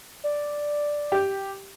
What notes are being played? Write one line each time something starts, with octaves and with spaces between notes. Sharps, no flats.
D5
G4